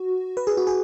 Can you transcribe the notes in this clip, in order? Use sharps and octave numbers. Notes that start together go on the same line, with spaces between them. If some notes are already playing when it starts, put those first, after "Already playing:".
Already playing: F#4
B4
G#4
F#4
G#4